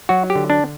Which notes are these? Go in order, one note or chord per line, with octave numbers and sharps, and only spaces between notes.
F#3 F#4
G4
D3
D4